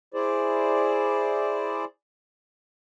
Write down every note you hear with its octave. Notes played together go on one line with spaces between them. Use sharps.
E4 G#4 C5 D5